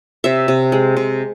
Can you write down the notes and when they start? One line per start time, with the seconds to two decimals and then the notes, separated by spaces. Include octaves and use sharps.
0.24 C3 E5
0.48 C3
0.72 G#3
0.97 C3